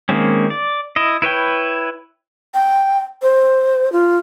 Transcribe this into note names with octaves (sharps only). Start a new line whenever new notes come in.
D#3 G#3 A#3 C4 C#4
D5
E4 D#5
E4 B4 C#5 G5
G5
C5
F4